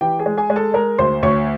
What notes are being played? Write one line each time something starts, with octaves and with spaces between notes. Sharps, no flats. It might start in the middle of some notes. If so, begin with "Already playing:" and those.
E3 G4 G5
G#4 G#5
G#3
G#4 G#5
G#3
A4 A5
G#3 A#4 A#5
D2 C5 C6
D2 C#5 C#6